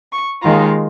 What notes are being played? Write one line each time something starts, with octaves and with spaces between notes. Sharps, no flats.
C#6
D#2 D#3 G#3 F4 A#5